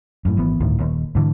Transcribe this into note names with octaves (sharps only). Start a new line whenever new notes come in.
F#2 A2
G#1 E3 B3
G1 D2 A2 D#3
D#1 D#2
G#2 D3 E3